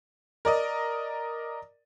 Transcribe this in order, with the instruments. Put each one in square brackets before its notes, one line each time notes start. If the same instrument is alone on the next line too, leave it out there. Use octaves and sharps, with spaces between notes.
[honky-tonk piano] A#4 D5 D#5